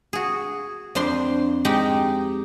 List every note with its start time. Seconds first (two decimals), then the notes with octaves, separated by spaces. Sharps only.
0.13 F#4 G#4
0.95 F2 D4 C5 C6
1.65 G#3 D#4 G4